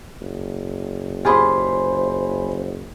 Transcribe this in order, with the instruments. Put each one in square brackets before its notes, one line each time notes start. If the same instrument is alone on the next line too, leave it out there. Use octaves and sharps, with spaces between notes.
[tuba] F#1
[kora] F4 G4 G#4 [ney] C5 [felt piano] G#5 B5 C6